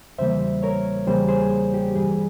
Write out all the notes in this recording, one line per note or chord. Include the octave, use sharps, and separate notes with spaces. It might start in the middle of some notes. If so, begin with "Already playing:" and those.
E2 C#3 E3 G3 A#3 C5 E5
A#4 C#5
E2 C#3 E3 G3 A#3 G#4 C5
G#4 C5
G4
G2 E3 G3 G#4